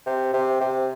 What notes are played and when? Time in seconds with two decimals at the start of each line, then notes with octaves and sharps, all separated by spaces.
0.06 C3
0.34 C3
0.61 C3